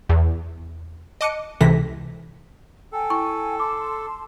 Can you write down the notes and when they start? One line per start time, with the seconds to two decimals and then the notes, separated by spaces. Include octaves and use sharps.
0.09 E2
1.21 D#5 A5 D6 F#6 C#7 D#7
1.61 C#2 C3 E3 A4 A#6 B6
2.92 A4 G5 G#5
3.10 E4 C#6
3.60 A5 C6 D6